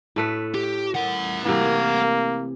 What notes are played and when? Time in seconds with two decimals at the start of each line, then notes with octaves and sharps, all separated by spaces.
0.16 A2 A3 B4
0.55 G4
0.95 A#4 F#5
1.46 C3 E3 A#3